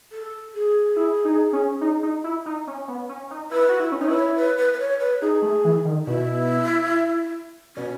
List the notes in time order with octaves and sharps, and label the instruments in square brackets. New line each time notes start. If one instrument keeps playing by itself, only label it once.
[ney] A4
G#4
[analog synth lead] E4
D#4
C#4
D#4
D#4
E4
D#4
C#4
B3
C#4
D#4
[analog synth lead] E4 [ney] B4
[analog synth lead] F#4
E4
C#4
[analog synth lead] D#4 [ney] C#5
[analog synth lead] E4 [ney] B4
[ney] C#5
B4
B4
B4
C#5
B4
[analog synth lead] D#4 [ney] G#4
[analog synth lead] A3
E3
D#3
[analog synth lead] B2 [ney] E4
[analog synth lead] B2 [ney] C#4